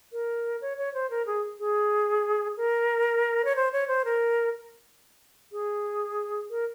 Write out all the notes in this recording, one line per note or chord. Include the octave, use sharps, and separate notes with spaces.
A#4
C#5
C#5
C5
A#4
G#4
G#4
A#4
C#5
C5
C#5
C5
A#4
G#4
A#4